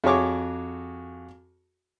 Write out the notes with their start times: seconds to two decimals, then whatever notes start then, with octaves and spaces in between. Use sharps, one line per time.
0.04 F2 F#4 G#4 C#5 C#6 D6